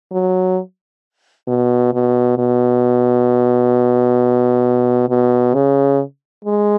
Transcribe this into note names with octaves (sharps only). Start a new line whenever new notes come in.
F#3
B2
B2
B2
B2
C#3
G#3